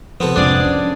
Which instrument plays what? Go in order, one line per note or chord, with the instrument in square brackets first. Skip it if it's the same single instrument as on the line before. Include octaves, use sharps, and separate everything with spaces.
[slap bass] C3 F3 [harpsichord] B3 C4 A4
[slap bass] F2 [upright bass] G#2 C3 [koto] D4 G#4 D5
[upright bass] F2 F3 [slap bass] C#4